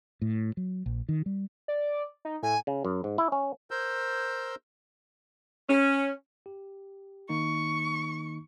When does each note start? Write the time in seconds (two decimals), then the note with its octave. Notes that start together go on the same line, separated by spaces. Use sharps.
0.22 A2
0.57 F#3
0.86 A#1
1.09 D#3
1.26 G3
1.68 D5
2.25 D#4
2.43 A2 G#5
2.67 C#3
2.85 F#2
3.04 G#2
3.18 E4
3.32 C#4
3.71 A#4 C5 E6 G6
5.69 C#4
6.46 G4
7.29 D#3 A#3 D#4 C#6